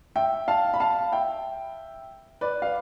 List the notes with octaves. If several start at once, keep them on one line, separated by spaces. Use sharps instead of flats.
E5 G5
F5 A5
B5
F5 A5
E5 G5
B4 D5
F5